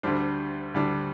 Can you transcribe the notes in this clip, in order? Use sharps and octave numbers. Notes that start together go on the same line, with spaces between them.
D2 D3 G3 D4 C5
D2 D3 G3 D4